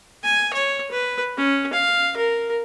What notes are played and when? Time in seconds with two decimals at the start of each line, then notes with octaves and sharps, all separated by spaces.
0.24 G#5
0.54 C#5
0.91 B4
1.38 C#4
1.73 F5
2.17 A#4